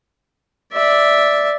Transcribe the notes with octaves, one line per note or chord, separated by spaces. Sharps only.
D5 E5